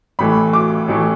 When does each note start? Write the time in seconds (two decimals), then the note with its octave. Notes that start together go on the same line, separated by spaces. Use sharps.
0.19 A1 A2 E3 A3 B5
0.53 D6
0.88 A1 A2 E3 A3